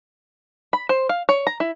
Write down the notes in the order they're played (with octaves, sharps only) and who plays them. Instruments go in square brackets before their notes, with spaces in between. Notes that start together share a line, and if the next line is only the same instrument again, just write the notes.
[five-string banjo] B5
C5
F5
C#5
A#5
E4